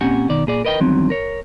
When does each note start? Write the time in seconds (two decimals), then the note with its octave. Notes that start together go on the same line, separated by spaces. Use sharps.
0.01 A#2 C4 C#4 G4 F#5 G#5
0.29 B2 D#3 D5
0.47 A#2 G#4 D5
0.65 A#4 B4 D#5 F5 G5
0.80 E2 G2 D#3 F#3 C4
1.10 A#4 C#5